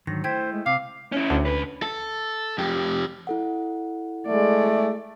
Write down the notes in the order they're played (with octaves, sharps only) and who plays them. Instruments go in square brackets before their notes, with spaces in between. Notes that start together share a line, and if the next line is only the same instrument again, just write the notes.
[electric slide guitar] G#2 D3 D#3 [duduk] F#3 [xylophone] A#6
[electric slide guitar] A3 E4 [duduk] C5 [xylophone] G5 G#6 B6
[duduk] G#3
[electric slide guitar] C3 [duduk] C4 [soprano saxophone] F5 [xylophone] D6
[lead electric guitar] C#4 E4
[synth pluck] D2
[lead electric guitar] C#2 B4
[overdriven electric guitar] A4
F2 G4
[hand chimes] E4 A4 F#5
[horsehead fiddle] G#3 D5 [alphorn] A3